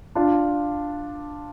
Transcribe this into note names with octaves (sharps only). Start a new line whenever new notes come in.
D4 F4